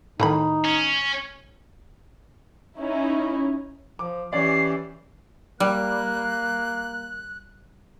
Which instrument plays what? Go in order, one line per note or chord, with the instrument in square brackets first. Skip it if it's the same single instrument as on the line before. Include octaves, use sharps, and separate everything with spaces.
[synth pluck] A2 D#3 [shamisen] A3 A#5 B5 [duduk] D#4
[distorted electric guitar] C#4
[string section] C#4 D#4 E4
[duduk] F3 [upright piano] D6
[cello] E3 [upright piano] C#4 C#5 D5 [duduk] G4 [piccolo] C7
[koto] G3 [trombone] A#3 [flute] F#6